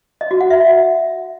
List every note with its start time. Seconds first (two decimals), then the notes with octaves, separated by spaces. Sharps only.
0.21 D#5
0.31 F#4
0.41 F#5
0.50 E5